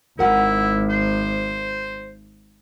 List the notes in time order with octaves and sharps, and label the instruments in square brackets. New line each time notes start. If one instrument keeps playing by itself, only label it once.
[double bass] G#1 [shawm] E4 [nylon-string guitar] A#4 F#5
[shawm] C5